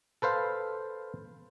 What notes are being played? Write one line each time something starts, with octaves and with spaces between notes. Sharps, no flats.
A4 B4 C5 F5